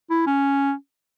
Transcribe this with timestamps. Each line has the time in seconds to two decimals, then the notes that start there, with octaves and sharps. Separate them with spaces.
0.10 E4
0.27 C#4